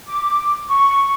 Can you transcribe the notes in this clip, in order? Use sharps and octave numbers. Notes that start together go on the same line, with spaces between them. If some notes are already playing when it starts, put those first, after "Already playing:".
D6
C#6